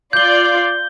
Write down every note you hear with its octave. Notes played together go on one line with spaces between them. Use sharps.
F4 D5 G6 G7